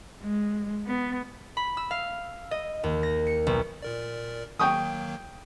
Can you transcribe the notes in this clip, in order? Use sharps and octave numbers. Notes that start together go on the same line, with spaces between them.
G#3
B3
B5
E6
F5
D#5
D#2
A#6
C#7
B1
A#2 A#4 D5
D#3 F#3 A#3 G5 C#6 D#6